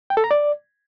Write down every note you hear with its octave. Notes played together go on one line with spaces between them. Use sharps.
G5
A4
A#5
D5